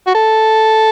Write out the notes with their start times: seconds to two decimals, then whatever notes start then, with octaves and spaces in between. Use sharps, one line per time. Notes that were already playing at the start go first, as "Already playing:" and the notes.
0.07 F#4
0.15 A4